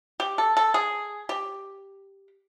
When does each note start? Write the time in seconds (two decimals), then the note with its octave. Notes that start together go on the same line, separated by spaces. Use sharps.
0.20 G4
0.38 A4
0.57 A4
0.74 G#4
1.29 G4